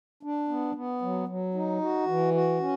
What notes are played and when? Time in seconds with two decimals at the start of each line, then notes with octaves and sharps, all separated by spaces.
0.23 D4
0.49 B3
0.75 B3
1.02 F#3
1.28 F#3
1.54 D#4
1.81 F#4
2.07 E3
2.34 F#4
2.60 C#4